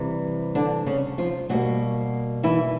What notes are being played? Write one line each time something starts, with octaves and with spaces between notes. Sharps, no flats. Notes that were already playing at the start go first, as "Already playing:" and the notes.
Already playing: C3 E3 G3
D3 D4
C#3 C#4
F3 F4
B2 F#3 G3 A#3 F#4
E3 E4